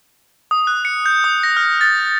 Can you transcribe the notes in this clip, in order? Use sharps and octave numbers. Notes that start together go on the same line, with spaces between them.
D#6
F#6
C#7
G6
D#6
A#6
F6
A6